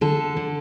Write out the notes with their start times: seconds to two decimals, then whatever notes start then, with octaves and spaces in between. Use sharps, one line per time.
0.01 D3 A4
0.37 D3